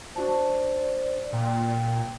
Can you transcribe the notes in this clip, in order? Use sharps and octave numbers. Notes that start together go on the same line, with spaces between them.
D4 F#4 C5 D5 A5
A#2 G5